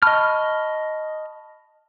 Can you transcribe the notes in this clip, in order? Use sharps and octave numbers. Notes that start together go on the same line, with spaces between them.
D#5 A5 B5 C#6 F6